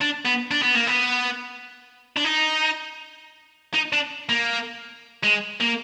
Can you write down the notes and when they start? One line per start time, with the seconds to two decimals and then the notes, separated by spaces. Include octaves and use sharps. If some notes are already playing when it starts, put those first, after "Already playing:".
0.01 D4
0.25 B3
0.51 D4
0.62 B3
0.75 A#3
0.87 B3
2.17 D4
2.25 D#4
3.74 D#4
3.93 D4
4.29 A#3
5.23 G#3
5.60 A#3